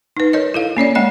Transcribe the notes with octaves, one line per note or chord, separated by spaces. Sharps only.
D#4 B4
A#4 C#5 D#5
E4 A4 F5
A#3 C#4 C#5 D5
G#3 C#4 C#5 D#5 G5